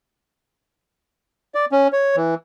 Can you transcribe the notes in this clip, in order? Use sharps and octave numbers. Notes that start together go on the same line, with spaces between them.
D5
C#4
C#5
E3